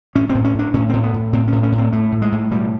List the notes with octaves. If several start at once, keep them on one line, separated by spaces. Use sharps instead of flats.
A2 C#4
C4
A2
C#4
A2 D4
A2 C#4
A2 C4
B3
A2
A2 C4
A2 C#4
C#4
A2
C4
A2 A3
A2
G#3
A2
B2 G3